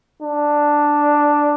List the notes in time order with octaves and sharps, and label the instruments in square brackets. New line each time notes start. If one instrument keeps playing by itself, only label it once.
[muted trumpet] D4